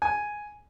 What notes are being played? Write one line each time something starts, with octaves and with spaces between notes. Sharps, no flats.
G#5